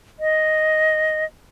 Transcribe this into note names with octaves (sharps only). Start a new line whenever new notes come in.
D#5